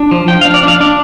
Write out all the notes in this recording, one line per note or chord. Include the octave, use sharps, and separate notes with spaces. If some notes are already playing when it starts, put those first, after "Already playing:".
Already playing: D4
F3
F3 G5
F5
D4
D5
D4 F5
D4 D5